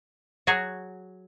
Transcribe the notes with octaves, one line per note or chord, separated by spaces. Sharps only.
F#3 F#4 G#4 C#5